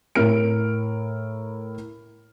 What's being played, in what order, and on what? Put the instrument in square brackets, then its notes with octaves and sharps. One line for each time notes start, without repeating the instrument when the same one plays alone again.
[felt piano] A2 E4 A#4 F6 D7